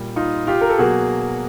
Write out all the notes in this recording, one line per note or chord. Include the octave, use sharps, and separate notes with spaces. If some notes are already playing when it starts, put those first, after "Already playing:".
Already playing: A#2 G3
D#4 F4
F4 G4
A#4
A4
B2 F#3 A#3 F#4 G#4